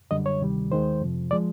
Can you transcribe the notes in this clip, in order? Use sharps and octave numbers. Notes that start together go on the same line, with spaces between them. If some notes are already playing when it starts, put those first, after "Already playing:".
F#2 D3 G3 D#5
C#5
D2 C3 D#3 G3
D#2 D#3 G#3 C5
F2 C3 F3
F3 G#3 D5